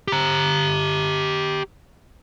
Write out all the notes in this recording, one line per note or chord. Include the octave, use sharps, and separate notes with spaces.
G4 A#5